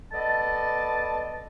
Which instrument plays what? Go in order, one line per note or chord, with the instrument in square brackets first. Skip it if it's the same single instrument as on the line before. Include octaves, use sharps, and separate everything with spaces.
[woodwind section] B3 A4 D5 D#5 A5